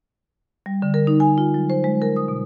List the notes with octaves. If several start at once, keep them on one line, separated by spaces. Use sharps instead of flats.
G3
D3
A#4
D#4
G#5
F4
F#3
C5
G#3
A#4
D#6
B2